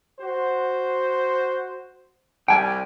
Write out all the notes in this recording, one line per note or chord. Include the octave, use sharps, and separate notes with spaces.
F#4 C5
C2 G3 G5 G#5